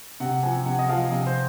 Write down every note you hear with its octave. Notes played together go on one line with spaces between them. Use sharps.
C3 F#5
F3 G#5
C3 F#5
D#5
F3 F5
C3 D#5
C5